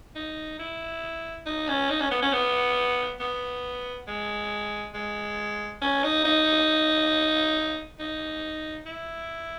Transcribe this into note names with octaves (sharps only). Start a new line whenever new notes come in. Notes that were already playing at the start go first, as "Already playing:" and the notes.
D#4
E4
D#4
C#4
D#4
C#4
B3
C#4
B3
B3
G#3
G#3
C#4
D#4
D#4
D#4
E4